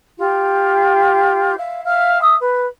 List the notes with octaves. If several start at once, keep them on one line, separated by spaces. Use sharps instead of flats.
F4 G4
E5 F5
E5 F5 F6
E5 D#6 E6
B4